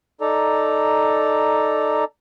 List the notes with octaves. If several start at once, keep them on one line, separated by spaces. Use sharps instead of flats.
D#4 A4 D5 A#5